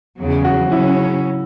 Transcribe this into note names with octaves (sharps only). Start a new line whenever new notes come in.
E2 C#3 F#3
F#4
C#3 F#3 C#4 E4